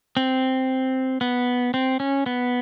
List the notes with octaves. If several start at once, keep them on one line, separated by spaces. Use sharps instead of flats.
C4
B3
C4
C#4
B3